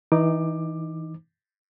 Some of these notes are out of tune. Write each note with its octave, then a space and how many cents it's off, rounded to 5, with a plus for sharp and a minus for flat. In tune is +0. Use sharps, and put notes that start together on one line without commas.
E3 -25 D#4 -5 D6 +15